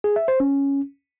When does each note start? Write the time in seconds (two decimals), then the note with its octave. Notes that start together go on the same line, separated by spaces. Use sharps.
0.04 G#4
0.16 E5
0.28 C5
0.40 C#4